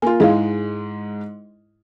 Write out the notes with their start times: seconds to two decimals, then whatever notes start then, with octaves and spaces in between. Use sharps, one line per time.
0.02 A#3 F4 G#5
0.20 G#2 G#3 E4 G#4 F5